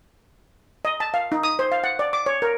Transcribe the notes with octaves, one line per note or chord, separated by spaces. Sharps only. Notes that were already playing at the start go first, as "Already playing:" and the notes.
D#5
A5
F5
D#4
D#6
C5
F5
F#5
D5
D6
C#5
A#4